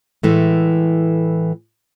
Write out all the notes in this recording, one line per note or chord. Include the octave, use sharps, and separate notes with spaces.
A2 E3 G#3 A3